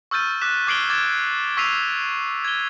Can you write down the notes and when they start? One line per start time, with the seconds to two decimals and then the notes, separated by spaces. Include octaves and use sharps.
0.11 C#6 E6 F6 G6 A6 D#7
0.41 D6 F#6 B6 E7
0.67 D6 G#6 C7 D7 F#7 G7
0.89 D6 G#6 A6 E7
1.57 C#6 E6 B6 C7 D#7 F7
2.45 G#6 G7